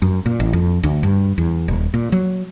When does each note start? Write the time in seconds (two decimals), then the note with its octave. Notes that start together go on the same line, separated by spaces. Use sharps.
0.02 F#2
0.26 A#2
0.40 A1
0.53 F2
0.83 D2
1.03 G2
1.38 E2
1.68 D#1
1.94 A#2
2.12 F#3